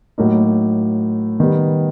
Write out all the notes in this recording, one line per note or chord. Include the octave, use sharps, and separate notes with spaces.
A2 F#3 A#3 D#4
D#3 G3 B3